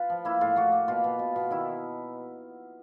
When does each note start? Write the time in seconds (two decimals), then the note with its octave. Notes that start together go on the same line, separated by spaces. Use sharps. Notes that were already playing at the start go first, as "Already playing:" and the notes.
Already playing: F4 B4
0.10 F3
0.25 A#3 E4
0.41 A2 F4
0.56 A#3 F#4
0.72 A#3
0.88 B2 F4
1.04 B2
1.19 B2
1.36 B2
1.50 D#3 E4